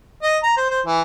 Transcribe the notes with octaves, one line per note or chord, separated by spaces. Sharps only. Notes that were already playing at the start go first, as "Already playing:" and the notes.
D#5
A#5
C5
C5
E3